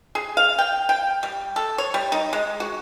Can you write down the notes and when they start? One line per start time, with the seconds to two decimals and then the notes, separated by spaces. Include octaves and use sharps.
0.15 G#4
0.37 F5
0.58 G5
0.89 G5
1.23 G3
1.56 A4
1.78 C#5
1.94 G3
2.12 D#4
2.33 G#3
2.60 F#4